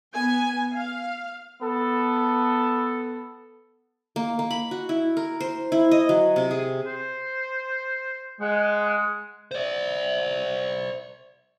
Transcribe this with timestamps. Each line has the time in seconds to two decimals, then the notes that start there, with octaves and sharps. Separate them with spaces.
0.15 B3 G#5
0.74 F5
1.61 B3 A4
4.16 A#3
4.39 A#3
4.51 B5
4.71 F#4
4.89 E4
5.17 A#4
5.40 C5
5.72 E4
5.91 D#5
6.09 F#3
6.36 C3
6.51 G#4
6.86 C5
8.41 G#3 F#5
9.51 C5 D5